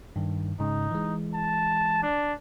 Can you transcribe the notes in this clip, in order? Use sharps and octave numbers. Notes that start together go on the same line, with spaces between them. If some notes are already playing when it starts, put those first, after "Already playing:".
G2 D#3
G#2 C#3 D#4
E3 G#3
A5
D4